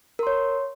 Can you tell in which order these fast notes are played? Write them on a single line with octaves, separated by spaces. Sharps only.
A#4 C6 C#5